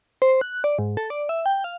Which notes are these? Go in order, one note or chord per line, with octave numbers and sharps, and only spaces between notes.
C5
F#6
D5
G#2
A4
D5
E5
G5
F5